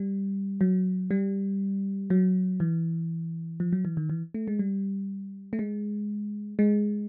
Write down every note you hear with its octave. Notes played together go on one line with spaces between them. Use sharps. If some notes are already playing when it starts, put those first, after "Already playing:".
Already playing: G3
F#3
G3
F#3
E3
F3
F#3
E3
D#3
E3
A3
G#3
G3
A3
G#3
G#3